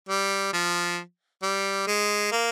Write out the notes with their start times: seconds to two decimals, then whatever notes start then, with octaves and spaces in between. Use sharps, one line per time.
0.09 G3
0.53 F3
1.43 G3
1.87 G#3
2.32 A#3